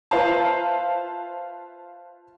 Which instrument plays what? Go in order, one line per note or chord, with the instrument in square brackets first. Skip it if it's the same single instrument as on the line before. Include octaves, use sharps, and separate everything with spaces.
[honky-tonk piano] F4 B4 C5 E5 F5 A5